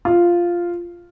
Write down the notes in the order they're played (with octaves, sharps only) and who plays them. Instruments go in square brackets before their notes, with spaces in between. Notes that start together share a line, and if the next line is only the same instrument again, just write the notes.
[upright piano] F4